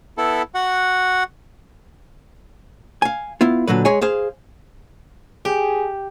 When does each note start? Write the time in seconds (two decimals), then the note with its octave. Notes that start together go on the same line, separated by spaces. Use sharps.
0.18 B3 E4 A4
0.54 F#4 F#5
3.02 F5 G#5
3.41 B3 E4 F4
3.67 A#2 D3 F#3 B4
3.85 G#3 G#4 C#5 G#5
4.01 G#4 C5 F5
5.45 G4 G#4